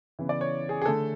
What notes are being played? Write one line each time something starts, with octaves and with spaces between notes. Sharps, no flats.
C#3 E3 B3
D5
C#5
G#4
G#4
D3 A3 A4